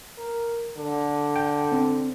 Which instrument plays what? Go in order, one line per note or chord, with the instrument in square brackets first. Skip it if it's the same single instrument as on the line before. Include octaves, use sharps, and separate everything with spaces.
[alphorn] A#4
D3
[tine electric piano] G5
C4